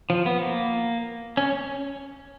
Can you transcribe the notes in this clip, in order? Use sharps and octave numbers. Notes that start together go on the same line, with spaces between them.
F3
B3
A#3
C#4